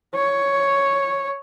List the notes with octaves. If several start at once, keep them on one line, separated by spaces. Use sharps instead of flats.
C#5